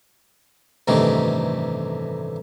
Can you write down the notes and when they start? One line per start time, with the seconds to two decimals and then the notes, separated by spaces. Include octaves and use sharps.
0.88 A1 G2 C3 D#3 A3